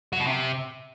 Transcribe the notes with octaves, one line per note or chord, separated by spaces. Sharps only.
F#3
B2
C3